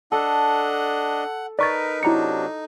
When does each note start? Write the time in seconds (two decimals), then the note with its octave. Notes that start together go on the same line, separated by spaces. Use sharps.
0.12 D4 A4 D#5 F#5
1.59 D#4 A#4 B4 D5 C#6 A6
2.03 C3 F#3 D4 E4 A#5 C#7